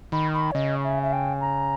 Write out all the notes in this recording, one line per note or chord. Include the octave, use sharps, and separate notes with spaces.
D#3 B5
B5
C#5
C#3 D#5
E5
E5
G5
A#5